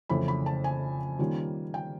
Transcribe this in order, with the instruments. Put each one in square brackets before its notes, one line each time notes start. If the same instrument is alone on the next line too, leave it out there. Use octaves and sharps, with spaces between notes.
[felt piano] F2 C#3 E3 A3 C#4 B5
B5
A5
G#5
D#3 G3 A#3 C#4 F4
G5